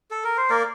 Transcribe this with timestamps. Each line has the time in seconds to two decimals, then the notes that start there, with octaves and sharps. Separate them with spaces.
0.11 A4
0.24 A#4
0.37 C5
0.50 A#3 A#4 D5